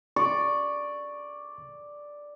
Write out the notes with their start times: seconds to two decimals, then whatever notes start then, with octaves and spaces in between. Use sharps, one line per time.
0.16 D5 C#6